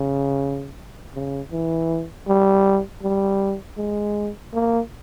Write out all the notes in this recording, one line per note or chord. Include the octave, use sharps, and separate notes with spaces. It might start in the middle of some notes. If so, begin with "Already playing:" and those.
Already playing: C#3
C#3
E3
G3
G3
G#3
A#3